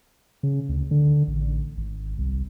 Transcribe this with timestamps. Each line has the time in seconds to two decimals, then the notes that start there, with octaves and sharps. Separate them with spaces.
0.43 C#3
0.69 D2
0.91 D3
1.28 A1
1.77 G#1
2.18 C2